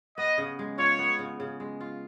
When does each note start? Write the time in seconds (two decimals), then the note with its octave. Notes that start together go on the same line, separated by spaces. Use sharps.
0.18 B3 D#5
0.38 C#3
0.59 G#3
0.78 F4 C#5
0.99 B3
1.19 C#3
1.40 C#3
1.60 G#3
1.80 F4